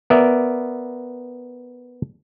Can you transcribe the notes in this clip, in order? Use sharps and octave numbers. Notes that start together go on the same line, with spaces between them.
B3 A#4 D5 E5